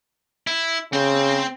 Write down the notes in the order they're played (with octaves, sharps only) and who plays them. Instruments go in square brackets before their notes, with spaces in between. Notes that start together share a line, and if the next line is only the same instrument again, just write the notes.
[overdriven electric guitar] E4
[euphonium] C#3 [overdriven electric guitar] C4 C5